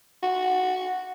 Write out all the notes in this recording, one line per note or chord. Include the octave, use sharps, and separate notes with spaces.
F#4